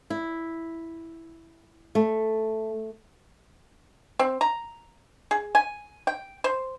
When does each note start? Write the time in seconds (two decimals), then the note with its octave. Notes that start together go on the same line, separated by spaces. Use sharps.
0.10 E4
1.95 A3
4.19 C4
4.41 A#5
5.31 G#4
5.55 G#5
6.07 G5
6.44 C5